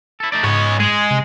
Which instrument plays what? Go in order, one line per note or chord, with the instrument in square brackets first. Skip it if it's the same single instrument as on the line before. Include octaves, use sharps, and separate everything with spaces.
[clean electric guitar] E4 A4
A3 D#4 D5
[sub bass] G#2 [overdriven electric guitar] G#3 C#5 [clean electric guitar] B3
[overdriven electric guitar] G#3 [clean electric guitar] G#4
[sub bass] C3